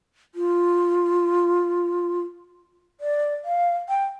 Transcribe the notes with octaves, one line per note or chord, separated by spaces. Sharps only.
F4
D5
F5
G5